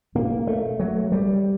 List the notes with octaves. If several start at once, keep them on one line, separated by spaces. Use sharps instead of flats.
B2 A#3
A3
F#3
G3